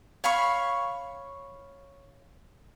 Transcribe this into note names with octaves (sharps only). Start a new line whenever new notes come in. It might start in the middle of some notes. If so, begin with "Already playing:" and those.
C#5 F5 B5 C#6